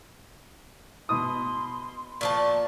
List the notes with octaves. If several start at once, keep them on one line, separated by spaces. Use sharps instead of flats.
B2 C6 D#6
A#2 F3 A5 C#6